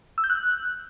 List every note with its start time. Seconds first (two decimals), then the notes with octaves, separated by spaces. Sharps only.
0.18 E6
0.24 G6
0.30 F#6